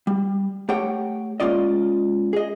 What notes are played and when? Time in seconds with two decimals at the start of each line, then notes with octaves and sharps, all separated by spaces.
0.07 G3
0.69 A3 G4 C#5 F#5 G5
1.40 G#3 A#3 C#4 F4 D5 D#5
2.33 G#4 D#5